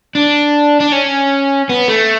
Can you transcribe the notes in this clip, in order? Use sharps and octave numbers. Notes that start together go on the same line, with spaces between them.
D4
D4
C#4
B3
A3